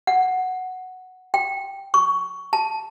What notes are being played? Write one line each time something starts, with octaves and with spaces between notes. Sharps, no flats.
F#5
G5
C#6
A5